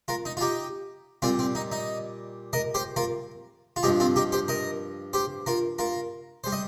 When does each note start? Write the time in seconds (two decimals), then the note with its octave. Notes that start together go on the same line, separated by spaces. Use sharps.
0.08 F4 A#4
0.25 D#4
0.37 F4
0.41 D#4 G4
1.22 A#2 G3 C4 F4
1.39 C4
1.55 D#4
1.72 D#4
2.53 A#4 D#5
2.75 G4 C5
2.96 F4 A#4
3.76 F4
3.83 G2 F3 D#4 G4
4.00 C4 F4
4.16 D#4 G4
4.32 G4 C5
4.48 A#4 D#5
5.13 G4 C5
5.46 F4 A#4
5.79 F4 A#4
6.44 G3 C5
6.52 D#5